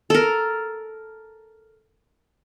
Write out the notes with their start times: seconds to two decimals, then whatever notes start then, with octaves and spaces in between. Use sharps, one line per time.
0.10 A4 A#4